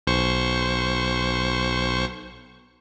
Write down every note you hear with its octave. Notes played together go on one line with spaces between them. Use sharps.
B1 C5 C#6